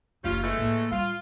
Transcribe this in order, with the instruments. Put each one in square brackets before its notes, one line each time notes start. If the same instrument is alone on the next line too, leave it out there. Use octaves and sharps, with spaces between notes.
[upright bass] F#1 D#4 [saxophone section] G3 C#4 F4
[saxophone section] E3 G#3 A3
[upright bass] A2 A#3
[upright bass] G3 [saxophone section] F4